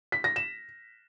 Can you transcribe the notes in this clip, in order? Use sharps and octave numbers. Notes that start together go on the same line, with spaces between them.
B6
A#6
E7